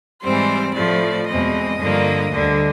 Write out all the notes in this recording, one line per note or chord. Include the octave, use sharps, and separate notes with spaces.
G#2 E3 G3 C4 C5
A2 F3 A3 D5
E2 B2 G#3 C4 D#5
G2 D3 F3 A#3
D2 D3 G3